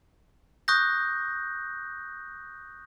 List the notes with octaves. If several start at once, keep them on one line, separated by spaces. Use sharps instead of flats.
C#6 D#6 F#6 G6 A#6